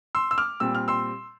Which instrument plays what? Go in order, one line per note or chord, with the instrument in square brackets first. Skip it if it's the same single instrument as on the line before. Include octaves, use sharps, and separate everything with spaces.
[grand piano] C6 E6
E6
D6 F6
A#2 G3 C4 E6
F6
C6 E6